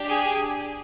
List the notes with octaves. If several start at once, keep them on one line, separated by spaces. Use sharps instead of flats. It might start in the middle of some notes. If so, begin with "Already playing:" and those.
Already playing: D4 G4
G#4 G#5